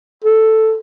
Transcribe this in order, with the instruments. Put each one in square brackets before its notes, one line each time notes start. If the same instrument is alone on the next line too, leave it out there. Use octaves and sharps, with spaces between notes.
[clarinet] A4